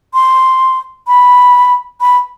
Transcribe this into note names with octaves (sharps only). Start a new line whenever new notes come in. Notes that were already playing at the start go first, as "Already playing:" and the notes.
C6
B5
B5